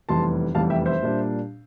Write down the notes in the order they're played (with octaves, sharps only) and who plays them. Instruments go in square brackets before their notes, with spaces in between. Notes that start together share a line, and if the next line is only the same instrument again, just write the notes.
[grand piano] F1 E2 E3 G3 A5 C6
F1 E2 E3 G3 F5 A5
E5 G5
C5 E5
A#2 G3 D4